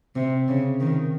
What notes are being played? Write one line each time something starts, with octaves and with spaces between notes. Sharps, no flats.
C3
C#3
D#3